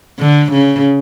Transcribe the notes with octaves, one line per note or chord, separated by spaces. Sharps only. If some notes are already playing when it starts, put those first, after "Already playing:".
D3
C#3